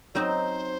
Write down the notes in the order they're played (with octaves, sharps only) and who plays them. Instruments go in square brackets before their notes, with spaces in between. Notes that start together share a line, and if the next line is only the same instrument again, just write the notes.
[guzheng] F#3 C4 D#4 [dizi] C5 D5